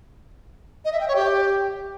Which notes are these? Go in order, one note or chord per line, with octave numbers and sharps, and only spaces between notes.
D#5
E5
G5
C#5
G4